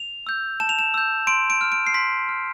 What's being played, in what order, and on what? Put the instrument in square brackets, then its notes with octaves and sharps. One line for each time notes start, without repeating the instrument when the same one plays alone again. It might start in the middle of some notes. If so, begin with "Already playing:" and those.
Already playing: [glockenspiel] F7
E6 G6
A5 E7
F7
E7
E6 G6
C6 D7
D7
F6
D7
C7
C6 B6
F6